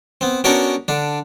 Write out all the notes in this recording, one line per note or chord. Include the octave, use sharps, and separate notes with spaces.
B3 C4
B3 C#4 D4 F#4 A#4 G5
D3 D4